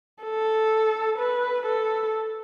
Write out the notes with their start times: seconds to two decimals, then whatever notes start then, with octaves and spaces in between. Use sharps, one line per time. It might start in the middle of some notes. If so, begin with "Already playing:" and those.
0.24 A4
1.19 B4
1.66 A4